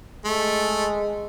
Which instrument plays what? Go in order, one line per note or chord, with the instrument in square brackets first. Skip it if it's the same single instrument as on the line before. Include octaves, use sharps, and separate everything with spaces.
[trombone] G#3 [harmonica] A3